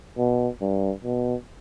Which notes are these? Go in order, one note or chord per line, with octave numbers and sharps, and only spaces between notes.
B2
G2
B2